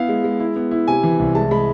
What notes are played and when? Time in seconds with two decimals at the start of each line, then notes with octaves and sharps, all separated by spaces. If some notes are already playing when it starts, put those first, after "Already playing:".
Already playing: B3 E4 F5
0.09 G#3
0.24 G#3
0.40 E4
0.56 B3
0.71 E4
0.88 C3 G#5
1.03 E3
1.19 C2
1.35 G#3 A5
1.51 G#3 B5